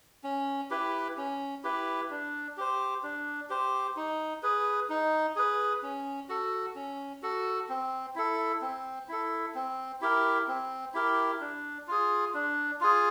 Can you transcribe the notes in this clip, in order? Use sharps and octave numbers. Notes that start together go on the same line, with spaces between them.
C#4
E4 G4 B4
C#4
E4 G4 B4
D4
G4 C5
D4
G4 C5
D#4
G#4 B4
D#4
G#4 B4
C#4
F#4 A4
C#4
F#4 A4
C4
E4 A4
C4
E4 A4
C4
E4 G4 A#4
C4
E4 G4 A#4
D4
F4 G#4
D4
F4 G#4